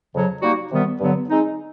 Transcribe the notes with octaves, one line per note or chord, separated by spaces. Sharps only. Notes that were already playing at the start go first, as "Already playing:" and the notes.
F2 C#3 F#3
G3 A#3 D#4 F#4
C3 D#3 G3 B3
G2 D3 F#3 B3
G#3 C4 D#4